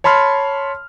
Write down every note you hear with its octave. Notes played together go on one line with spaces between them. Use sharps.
C#5 A5 B5 C6 F6